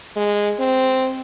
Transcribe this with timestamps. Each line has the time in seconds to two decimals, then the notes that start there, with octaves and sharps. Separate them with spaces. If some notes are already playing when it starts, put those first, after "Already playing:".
0.17 G#3
0.60 C4